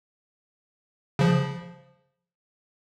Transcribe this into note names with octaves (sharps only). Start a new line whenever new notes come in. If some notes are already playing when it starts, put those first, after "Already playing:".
C#3 F3